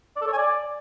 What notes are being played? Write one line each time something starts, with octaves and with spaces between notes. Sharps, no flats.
D5
A4
C#5
G#5
D5